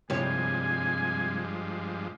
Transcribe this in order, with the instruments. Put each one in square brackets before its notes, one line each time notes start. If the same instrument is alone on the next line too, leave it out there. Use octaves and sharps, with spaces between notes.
[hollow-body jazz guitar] C2 [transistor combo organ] G2 F3 G#3 [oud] G3 C#5 [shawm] G#5